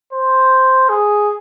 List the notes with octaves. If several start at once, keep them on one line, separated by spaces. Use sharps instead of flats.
C5
G#4